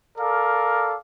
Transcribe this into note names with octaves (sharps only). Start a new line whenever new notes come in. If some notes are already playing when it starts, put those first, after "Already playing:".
A4 A#4 D5 F5